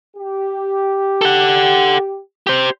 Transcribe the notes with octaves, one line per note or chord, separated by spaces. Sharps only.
G4
A4 F#5
G4 C5